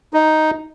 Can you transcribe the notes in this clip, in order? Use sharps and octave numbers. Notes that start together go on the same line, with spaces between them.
D#4